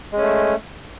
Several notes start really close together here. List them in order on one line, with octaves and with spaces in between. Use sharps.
G#3 C#4 A3